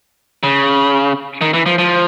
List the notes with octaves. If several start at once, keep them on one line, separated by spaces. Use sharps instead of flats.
C#3
D#3
E3
F3
F3